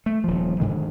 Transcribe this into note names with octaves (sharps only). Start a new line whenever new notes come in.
A3
D#1 F3
G#2 D3 D#3 G#3